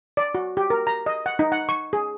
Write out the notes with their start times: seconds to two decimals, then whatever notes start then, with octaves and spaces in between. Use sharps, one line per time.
0.17 D5
0.35 F#4
0.57 G4
0.70 A#4
0.87 A#5
1.06 D#5
1.26 F#5
1.39 D#4
1.52 F#5
1.69 C#6
1.93 G#4